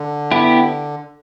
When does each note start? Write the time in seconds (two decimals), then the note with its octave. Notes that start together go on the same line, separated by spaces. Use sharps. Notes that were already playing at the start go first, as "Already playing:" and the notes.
Already playing: D3
0.31 B3 E4 G4